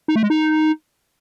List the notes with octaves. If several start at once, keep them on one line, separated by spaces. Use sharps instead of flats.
D#4
A3
G#3
D#4